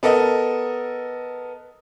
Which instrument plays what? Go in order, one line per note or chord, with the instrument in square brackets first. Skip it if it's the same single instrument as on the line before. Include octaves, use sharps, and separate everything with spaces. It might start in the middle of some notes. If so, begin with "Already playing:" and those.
[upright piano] B3 A4 A#4 D#5